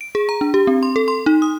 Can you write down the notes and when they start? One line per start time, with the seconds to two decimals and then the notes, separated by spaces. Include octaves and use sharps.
0.01 D7
0.15 G#4
0.29 A#5
0.41 D4
0.54 G4
0.67 C4
0.83 C6
0.96 A4
1.08 C6
1.26 D#4
1.42 D#6